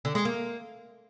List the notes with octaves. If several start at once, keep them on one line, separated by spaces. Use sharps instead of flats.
D3
G#3
A#3